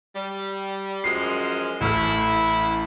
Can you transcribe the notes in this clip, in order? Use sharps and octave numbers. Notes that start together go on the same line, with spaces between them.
G3
F#2 F3 G#3 C7
A1 A3 E4 F6